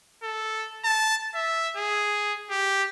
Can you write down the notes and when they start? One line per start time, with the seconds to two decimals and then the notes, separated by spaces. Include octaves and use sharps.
0.23 A4
0.84 A5
1.35 E5
1.77 G#4
2.50 G4